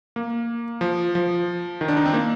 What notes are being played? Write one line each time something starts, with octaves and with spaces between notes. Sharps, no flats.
A#3
F3
F3
D#3
D4
D#4
C4
A#3